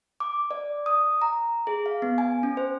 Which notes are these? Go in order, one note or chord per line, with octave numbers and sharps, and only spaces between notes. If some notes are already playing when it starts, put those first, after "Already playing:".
D6
D5
D#6
A#5
G#4
F5
B3
G#5
C#4
C5